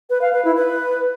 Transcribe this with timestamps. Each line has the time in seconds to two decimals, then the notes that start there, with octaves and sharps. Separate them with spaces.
0.10 B4
0.21 F5
0.33 B4
0.45 E4
0.56 B4